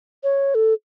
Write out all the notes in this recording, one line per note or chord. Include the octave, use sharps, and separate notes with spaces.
C#5
A4